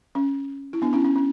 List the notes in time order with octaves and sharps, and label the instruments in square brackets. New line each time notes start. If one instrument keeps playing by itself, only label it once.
[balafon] C#4
E4
B3 D4
C#4 E4
C#4
C#4